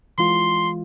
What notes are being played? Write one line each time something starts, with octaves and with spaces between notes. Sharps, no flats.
E3 G#3 F4 C6